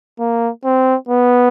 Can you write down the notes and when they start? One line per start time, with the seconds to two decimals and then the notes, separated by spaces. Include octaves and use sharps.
0.19 A#3
0.65 C4
1.09 B3